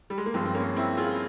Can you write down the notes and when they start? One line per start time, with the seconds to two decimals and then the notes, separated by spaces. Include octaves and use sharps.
0.10 G3
0.18 G#3
0.26 A#3
0.34 G1 G2 F3 G#3 C4
0.45 C4
0.55 A#3 C#4
0.76 C4 E4
0.97 F4 G#4